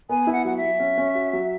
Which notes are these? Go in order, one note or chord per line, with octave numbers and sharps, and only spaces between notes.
B3 G#5
E4
F#5
F#3 F#5
E5
F#3
C#4
C#4
F#4
F#3